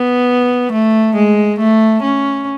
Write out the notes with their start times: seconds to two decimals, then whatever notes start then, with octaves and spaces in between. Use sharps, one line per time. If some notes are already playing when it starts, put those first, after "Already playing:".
Already playing: B3
0.72 A3
1.15 G#3
1.59 A3
2.03 C#4